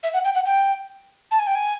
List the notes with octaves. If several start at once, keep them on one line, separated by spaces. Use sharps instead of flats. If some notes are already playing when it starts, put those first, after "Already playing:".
E5
F#5
G5
F#5
G5
A5
G#5
G5
G#5